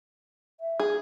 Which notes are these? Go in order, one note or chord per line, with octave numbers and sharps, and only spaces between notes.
E5
G#4